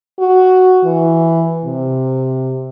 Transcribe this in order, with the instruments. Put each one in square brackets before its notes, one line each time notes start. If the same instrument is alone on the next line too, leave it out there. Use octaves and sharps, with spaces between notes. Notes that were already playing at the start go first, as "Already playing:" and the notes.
[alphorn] F#4
E3
C3